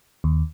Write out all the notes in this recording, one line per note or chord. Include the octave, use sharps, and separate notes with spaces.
D#2